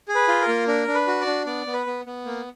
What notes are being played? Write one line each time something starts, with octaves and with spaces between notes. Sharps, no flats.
G#4
B4
F4
A#4
A#3
D4 A#4
D4
B4
F#4
D5
D4
B3 D5
B3
B4
B3
B3
A#3